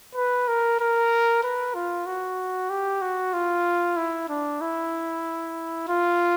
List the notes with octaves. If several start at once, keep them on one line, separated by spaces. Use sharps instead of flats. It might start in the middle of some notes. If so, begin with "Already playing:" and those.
B4
A#4
A#4
B4
F4
F#4
G4
F#4
F4
E4
D4
E4
F4